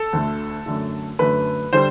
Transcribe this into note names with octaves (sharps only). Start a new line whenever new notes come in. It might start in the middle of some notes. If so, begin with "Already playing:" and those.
Already playing: A4
D2 D3 A3
F#2 D3 A3
F#2 D3 A3 B4
D3 G3 C5